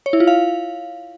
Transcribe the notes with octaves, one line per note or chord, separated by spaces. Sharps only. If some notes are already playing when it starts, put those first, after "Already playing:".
C#5
E4
F4
F5